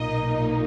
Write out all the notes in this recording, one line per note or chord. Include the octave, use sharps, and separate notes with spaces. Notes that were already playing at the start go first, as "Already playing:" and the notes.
Already playing: B1 A#2 A#3 D#4 D#5